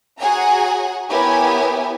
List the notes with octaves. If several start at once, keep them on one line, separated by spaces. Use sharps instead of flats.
F#4 G#4 C#5 F#5 G#5 A#5
B3 E4 G4 A#4 C#5 G#5